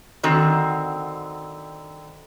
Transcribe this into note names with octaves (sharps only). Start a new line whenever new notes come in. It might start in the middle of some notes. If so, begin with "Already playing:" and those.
D3 D#3 C4 F#4